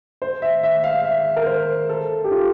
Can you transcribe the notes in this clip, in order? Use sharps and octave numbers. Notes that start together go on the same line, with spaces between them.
C5
E5
E5
F5
E5
A#4
C5
A4
G4
F4